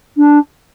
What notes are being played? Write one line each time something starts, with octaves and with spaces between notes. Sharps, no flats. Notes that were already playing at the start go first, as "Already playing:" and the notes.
D4